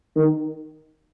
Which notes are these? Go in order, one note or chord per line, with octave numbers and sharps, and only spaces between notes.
D#3